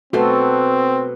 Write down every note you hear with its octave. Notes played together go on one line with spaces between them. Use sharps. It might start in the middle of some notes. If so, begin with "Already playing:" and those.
B2 A3 C4 F#4 A4 C6